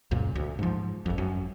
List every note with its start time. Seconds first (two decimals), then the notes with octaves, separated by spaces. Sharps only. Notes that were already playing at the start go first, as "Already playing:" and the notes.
0.11 C#2 F#2 A#2
0.35 D2
0.59 G#2 F3
1.06 G#1 F2
1.18 F#2